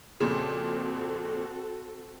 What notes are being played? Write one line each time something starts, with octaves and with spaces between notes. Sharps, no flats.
F2 A#2 C#3 C4 F#4 A4